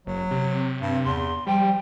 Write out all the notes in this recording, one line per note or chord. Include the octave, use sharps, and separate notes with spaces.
F#1 F#3
C3
G2
E2 C6
F3 G3 G5